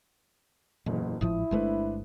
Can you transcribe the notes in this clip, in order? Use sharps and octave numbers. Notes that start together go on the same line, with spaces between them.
F#1 B1 E2 A#2
G#1 A2 F3 E4 D#6
G1 G#3 A3 D4 B4 C5